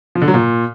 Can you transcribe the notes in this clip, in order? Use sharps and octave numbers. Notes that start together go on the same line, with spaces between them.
F3
D3
F#3
A#2